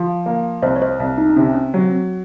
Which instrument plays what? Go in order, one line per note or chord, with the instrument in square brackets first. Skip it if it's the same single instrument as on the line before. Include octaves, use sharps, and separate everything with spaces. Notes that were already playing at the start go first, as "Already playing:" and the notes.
Already playing: [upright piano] F3
A#3
[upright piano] C2 [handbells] C5 D#5
[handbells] C#5
C5 D#5
[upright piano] C2
[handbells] D#4
D#4
[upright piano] C3 [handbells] C#4
[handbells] C#4
[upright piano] F#3 [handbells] C4
[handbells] C4